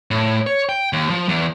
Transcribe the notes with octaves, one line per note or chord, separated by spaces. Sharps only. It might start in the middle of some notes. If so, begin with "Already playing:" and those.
A2
C#5
G5
D#2
F3
E2